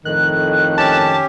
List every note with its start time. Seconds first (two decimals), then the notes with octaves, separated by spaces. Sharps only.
0.05 F2 A2 D#3 F#6
0.78 C#4 G4 A5